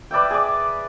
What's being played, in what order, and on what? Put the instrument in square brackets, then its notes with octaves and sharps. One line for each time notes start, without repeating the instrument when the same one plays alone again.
[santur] B4 D5 E5 G5
G#4 D5